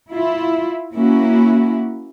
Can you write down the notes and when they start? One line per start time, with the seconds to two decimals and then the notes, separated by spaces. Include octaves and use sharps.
0.10 E4 F4
0.93 A#3 C#4 E4 F#4